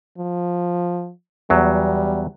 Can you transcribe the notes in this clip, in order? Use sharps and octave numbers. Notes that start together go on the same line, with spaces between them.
F3
E2 F#3 G3